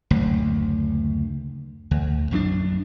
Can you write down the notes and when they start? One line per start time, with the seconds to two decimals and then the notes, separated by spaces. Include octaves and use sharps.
0.11 F#1 D2
1.91 D2
2.31 A#1 F#2 F3 D4